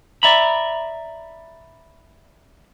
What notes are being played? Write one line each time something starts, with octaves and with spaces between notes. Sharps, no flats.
D5 E5 A#5 B5